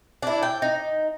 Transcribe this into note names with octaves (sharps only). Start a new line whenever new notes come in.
D4 E4
G5
D#4